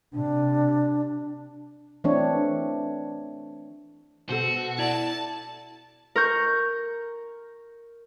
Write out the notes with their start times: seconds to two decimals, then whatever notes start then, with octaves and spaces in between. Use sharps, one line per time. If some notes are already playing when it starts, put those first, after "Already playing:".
0.13 C3 D4
2.04 E3 A3 C4 D4 C#5
4.29 B2 F#4 A4 C5
4.79 E4 D5 A5
6.16 A#4 C#6 G6